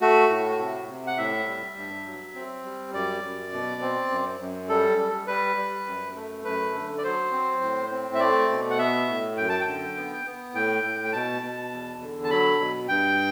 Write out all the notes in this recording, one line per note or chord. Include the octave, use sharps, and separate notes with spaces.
A3 F#4
A2
C3
C3
F#5
A2 E5
G3
G2
F#3
C4
G3
F#2 D5
F#2
B2
C4
F#2
F#2
G3 A4
G3
G3 B4
G3
F#2
A3
F#2 B4
D3
D5
F#3 C5
C4
A2
C4
E5
A3 D5
B2
F#5
B3 E5
A2
F#2 G5
A5
G5
D3
B3
B3
A2 G5
A2
G5
B2 A5
B2
E2
D3
A5
F#3 B5
B2
G2 G5